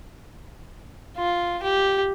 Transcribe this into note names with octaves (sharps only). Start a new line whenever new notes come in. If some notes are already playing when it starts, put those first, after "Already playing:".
F4
G4